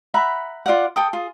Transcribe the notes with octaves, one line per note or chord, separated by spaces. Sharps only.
E5 F#5 A#5 B5
F4 D5 F5 F#5
A4 G5 D#6
F4 G#4